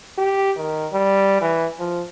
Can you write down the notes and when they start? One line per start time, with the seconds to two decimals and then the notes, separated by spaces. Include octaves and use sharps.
0.18 G4
0.58 D#3
0.93 G3
1.42 E3
1.79 F3